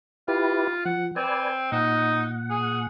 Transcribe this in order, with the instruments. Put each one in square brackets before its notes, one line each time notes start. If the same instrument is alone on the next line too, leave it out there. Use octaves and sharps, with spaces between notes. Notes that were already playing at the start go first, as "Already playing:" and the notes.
[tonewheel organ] E4 G4 B4 [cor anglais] F4
[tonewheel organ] F3 [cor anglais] F#5
[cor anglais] C4 [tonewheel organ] B4 D5 G#5
[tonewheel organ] A#2 F#5 [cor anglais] D#4
[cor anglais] G#4